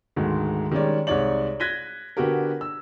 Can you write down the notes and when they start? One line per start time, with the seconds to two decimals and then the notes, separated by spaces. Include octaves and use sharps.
0.16 D2 G#2 D#3 G#3
0.71 D#3 G3 G#3 C#4 C#5 D5
1.07 C2 G#3 D#4 C#5 D5 F#7
1.60 F#6 G#6 A#6 B6 D#7 G7
2.17 D3 B3 F#4 G4 A#4
2.61 E6